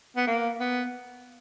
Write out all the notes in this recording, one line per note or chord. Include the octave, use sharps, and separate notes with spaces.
B3
A#3
B3